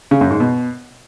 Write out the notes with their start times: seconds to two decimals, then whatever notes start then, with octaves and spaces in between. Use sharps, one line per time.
0.11 C#3
0.21 F#2
0.30 G#2
0.40 B2